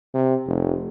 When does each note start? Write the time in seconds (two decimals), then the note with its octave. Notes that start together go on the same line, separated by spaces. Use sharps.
0.14 C3
0.47 F1